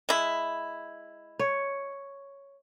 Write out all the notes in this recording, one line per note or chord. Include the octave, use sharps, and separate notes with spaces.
G#3 E4
C#5